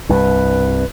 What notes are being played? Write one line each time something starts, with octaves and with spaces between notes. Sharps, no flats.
C2 G2 B4